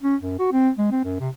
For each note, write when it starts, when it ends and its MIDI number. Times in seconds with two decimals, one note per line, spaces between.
0.03 0.16 61
0.21 0.37 42
0.39 0.48 66
0.52 0.69 60
0.78 0.89 56
0.91 1.02 60
1.04 1.15 42
1.20 1.29 48